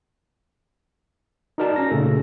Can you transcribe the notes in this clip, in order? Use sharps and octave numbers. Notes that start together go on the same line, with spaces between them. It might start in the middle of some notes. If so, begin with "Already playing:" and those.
D#4 F#4 A#4 D5 A5
C#4 A#6
A#2 C#3 A3 A4